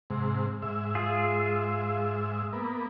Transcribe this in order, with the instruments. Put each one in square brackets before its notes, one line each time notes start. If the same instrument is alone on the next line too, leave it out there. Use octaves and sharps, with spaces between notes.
[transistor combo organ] G#2 C3
G#2 E5
[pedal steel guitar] F4 G#4
[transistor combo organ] A#3 B3